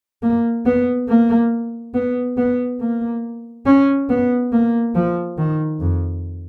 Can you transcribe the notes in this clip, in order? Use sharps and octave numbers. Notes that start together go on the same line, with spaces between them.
A#3
B3
A#3
B3
B3
A#3
C#4
B3
A#3
F3
D#3
F2